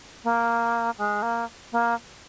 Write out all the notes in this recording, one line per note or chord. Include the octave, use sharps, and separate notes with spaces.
A#3
G#3
A#3
A#3